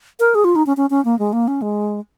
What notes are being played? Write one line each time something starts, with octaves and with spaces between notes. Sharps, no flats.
A#4
G#4
F4
D#4
C#4
C#4
C#4
A#3
G#3
A#3
C#4
G#3